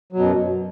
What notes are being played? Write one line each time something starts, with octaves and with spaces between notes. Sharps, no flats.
F#2 B2 F#3